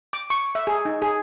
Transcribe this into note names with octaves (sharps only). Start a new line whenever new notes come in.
D6
C#6
E5
G#4
D#4
G#4